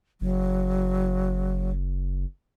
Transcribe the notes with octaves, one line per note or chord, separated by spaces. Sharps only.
F#1 F#3